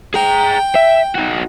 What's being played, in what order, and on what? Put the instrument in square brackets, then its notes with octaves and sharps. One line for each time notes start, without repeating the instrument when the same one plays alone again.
[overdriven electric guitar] G#4 A#5 [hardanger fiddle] G5
[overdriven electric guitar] E5
D#4 F#4